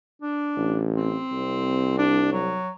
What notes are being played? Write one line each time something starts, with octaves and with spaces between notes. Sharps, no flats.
D4
A1
C4
C2
D4
F#3